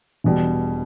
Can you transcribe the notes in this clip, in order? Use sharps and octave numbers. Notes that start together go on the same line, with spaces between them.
E1 E2 B2 G3